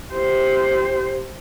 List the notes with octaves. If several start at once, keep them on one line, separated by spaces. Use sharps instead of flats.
G4 C5